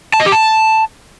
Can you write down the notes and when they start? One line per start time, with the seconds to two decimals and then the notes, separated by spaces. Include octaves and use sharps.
0.14 A5
0.20 D#5
0.26 G4
0.32 A5